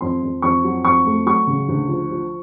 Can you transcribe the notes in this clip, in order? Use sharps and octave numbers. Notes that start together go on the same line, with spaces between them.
F2 C6
F2
F2 C#6
F#3
F2 C#6
A3
F#3 C#6
C#3
D2
F3
F3